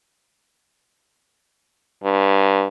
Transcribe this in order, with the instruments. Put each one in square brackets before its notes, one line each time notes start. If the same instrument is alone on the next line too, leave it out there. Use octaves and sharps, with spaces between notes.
[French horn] G2